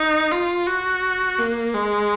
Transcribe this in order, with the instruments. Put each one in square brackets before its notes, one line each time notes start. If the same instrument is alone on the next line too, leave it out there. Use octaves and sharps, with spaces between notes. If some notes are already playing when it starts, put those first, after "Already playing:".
Already playing: [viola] D#4
F4
F#4
A#3
G#3